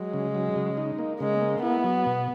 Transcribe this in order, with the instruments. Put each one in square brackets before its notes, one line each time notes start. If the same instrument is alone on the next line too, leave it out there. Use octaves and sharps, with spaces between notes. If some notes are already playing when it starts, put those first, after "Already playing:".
Already playing: [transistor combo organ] F#3 [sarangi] G#3
[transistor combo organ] C#3
F#3
C#3
D#4
A#3
[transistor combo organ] C#3 [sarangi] G#3
[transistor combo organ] A#3
[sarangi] B3 [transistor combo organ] E4
[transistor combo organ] F#3
B2